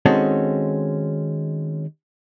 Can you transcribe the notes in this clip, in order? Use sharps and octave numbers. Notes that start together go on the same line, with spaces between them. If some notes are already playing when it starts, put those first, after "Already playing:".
D#3 G#3 C4 C#4 F#4 A4